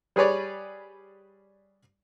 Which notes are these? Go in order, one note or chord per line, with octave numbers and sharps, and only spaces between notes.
G3 G#4 B4 C#5 D5